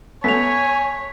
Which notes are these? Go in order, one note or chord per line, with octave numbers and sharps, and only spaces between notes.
A3 B3 C#5 G#5 B6 F7